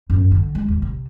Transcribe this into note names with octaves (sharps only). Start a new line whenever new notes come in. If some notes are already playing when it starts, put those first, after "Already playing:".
F#2
D3
G#3
D#2
C3